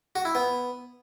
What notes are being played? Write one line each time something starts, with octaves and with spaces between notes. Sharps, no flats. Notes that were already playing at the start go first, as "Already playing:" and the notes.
F#4
E4
B3